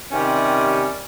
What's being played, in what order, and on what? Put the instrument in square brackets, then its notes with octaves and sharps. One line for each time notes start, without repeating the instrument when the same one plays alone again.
[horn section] C3 D#3 G3 C#4